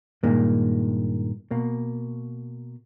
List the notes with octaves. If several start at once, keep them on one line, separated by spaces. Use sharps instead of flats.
G2 A#2 D#3 G#3 A#3
B2 A#3